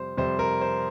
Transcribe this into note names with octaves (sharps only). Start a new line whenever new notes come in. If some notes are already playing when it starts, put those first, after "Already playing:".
Already playing: F2 C3 G3 C5
F2 C3 G3 C5
A#4
C5